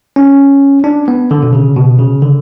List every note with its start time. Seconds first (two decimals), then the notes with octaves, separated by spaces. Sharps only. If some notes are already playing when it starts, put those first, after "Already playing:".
0.16 C#4
0.84 D4
1.08 B3
1.31 D3
1.43 B2
1.53 C#3
1.76 B2
1.99 C#3
2.22 D3